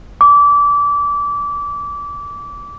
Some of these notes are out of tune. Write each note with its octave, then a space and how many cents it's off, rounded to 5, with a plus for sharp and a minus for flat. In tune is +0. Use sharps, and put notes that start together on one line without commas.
D6 -25